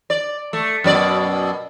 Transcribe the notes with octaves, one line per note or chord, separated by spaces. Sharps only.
D5
A3
F#2 B2 D5